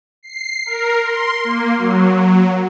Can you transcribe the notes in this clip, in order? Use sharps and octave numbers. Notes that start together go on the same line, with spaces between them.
C7
A#4
C6
A#3
F#3